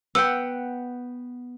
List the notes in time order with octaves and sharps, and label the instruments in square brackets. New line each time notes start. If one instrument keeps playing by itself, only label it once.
[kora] B3 F#5 G5 [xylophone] E6